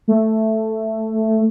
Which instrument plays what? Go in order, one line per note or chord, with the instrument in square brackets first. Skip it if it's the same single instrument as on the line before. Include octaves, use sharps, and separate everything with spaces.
[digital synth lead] A3